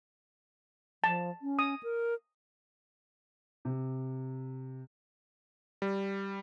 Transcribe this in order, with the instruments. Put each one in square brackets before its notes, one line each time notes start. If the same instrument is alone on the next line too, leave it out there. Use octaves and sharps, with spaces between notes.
[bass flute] F3 [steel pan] A5
[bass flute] C#4
[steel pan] D#6
[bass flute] A#4
[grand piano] C3
[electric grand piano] G3